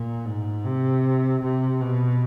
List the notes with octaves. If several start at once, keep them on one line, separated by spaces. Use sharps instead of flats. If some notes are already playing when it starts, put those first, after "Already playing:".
Already playing: A#2
G#2
C3
C3
B2